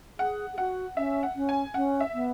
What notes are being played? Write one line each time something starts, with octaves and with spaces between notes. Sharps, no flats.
G#4 F#5
G#4
F#4 F#5
C#4 E5
F#5
C#4
G#5
C#4 F#5
E5
B3